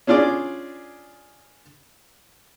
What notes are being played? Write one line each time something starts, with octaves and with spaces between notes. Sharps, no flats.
C#4 D4 F4 G#4 D5